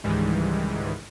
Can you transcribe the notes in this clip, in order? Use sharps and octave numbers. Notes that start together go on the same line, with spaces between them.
C#2 G#2 D#3 E3 G3 G#3